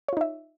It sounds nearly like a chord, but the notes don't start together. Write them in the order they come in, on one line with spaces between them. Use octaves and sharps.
C#5 F4 D#4 E5